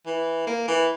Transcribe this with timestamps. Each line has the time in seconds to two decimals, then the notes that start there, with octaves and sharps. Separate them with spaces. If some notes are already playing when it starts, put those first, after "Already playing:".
0.06 E3
0.47 A#3
0.68 E3